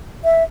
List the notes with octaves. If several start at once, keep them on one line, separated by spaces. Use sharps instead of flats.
E5